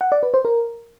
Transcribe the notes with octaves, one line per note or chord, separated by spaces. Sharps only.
F#5
D5
B4
C5
A#4